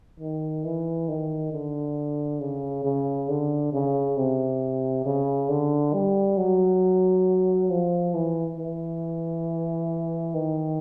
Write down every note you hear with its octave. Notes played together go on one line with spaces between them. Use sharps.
D#3
E3
D#3
D3
C#3
C#3
D3
C#3
C3
C#3
D3
G3
F#3
F3
E3
E3
D#3